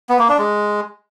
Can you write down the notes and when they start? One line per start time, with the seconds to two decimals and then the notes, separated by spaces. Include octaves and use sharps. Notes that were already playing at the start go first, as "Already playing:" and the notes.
0.09 B3
0.19 A#3
0.29 D4
0.39 G#3